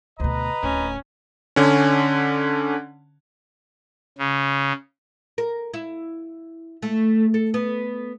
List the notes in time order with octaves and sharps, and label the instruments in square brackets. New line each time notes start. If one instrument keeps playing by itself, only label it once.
[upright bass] D2 B2 [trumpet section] B4 D#5 A#5
[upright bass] D1 [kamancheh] C#4
[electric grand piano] D3 C#4
[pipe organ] C#3
[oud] A#4
E4
A3
A4
B3